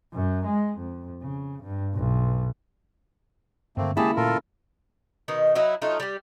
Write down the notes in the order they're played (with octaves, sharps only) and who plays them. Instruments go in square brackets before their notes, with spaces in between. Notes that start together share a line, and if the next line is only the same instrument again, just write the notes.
[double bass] F#2
G#3
F2
C#3
G2
B1
[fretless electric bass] G2 D3 [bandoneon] A3 A#3 C4
[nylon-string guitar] D#2 C#3 E4 [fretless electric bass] G#3 [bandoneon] G4 G#4 A5
[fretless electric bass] A#2 A3 [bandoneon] F4 A4 A#4
[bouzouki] B2 D#3 D#4
F#3 D#4 E4
F#3 A3 D#4 F4
G3 G4